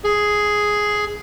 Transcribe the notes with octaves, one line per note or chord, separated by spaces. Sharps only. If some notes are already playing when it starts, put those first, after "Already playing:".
G#4